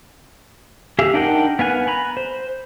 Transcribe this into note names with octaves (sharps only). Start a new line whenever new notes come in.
G4 G#4 E5 F5
D4 D#4 A#4 F#5 G5
B3 F5 G#5 F#6
A#5 B5 F#6
C5